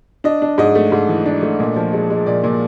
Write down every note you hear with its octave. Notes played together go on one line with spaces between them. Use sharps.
D4 D#5
D4
G#2 D#5
A3
G#2
E3
D4
A3
A#2
F3
G#3
G#3
A#2 D5
A#2